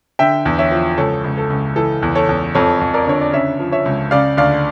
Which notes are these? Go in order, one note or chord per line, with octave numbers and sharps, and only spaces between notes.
D3 E5 G5
E2
C#5 E5
F3
C#2 A4 C#5
C#2
A4
C#2
E3 A4
E2
A4 C#5
E2
F2 A4 C#5
F2
A#4 D5
D3 C#5
D5
C#3 C#5 E5
F3
C#5 E5
C#2
C#3 D5 F5
D2 D5 F5